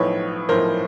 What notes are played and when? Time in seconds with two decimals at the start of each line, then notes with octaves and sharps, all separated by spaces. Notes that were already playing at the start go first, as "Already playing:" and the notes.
Already playing: B1 A2 F3 B4 C#5
0.49 B1 A2 F3 A#4 C5